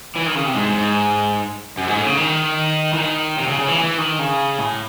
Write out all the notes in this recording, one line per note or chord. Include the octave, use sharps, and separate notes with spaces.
E3
D#3
C#3
C3
G#2
G#2
F#2
G#2
A2
C#3
D#3
E3
D#3
C3
C#3
C#3
E3
E3
D#3
C#3
A2